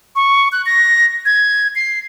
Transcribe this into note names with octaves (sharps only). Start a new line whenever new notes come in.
C#6
F#6
A#6
G#6
C7